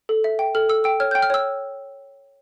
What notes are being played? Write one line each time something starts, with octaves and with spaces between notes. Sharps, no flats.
A4
E5
G5
A4 F6
A4 E6
G5 E6
C#5 F6
G5 G6
F6
C#5 E6